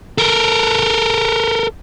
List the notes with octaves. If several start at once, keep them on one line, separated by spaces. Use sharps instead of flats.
A4 A#4